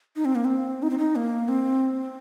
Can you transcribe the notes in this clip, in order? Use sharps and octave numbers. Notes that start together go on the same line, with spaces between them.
D#4
C4
A#3
C4
D#4
C4
D#4
A#3
C4